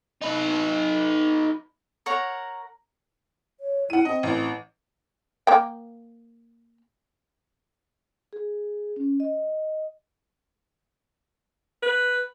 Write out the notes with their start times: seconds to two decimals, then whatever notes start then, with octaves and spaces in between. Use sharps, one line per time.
0.22 D#4 B4
2.06 A#4 C#5 F#5 A#5
3.60 C#5
3.90 E4 F#5 D#7
4.05 C4 D#5
4.23 A1
5.47 A#3 G5
8.33 G#4
8.96 C#4
9.20 D#5
11.83 B4